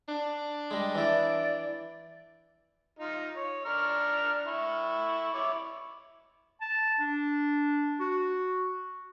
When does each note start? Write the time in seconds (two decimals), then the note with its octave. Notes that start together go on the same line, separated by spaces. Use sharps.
0.09 D4
0.71 G3 G#3 D#5
0.95 E3 E4 D5
2.99 D#4 F4
3.36 C#5
3.65 D4 A#5 F6
4.47 E4 C#6
5.34 E4 C#5 D6
6.61 A5
6.99 D4
8.00 F#4